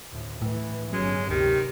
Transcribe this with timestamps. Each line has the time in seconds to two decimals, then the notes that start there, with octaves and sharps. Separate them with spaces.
0.11 D2 A2
0.42 A2 E3
0.93 G1 F#3 G#3 C#4
1.30 D2 C3 D#3 G4